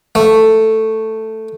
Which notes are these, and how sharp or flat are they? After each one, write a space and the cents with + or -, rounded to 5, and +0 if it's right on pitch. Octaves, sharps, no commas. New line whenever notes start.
A3 +5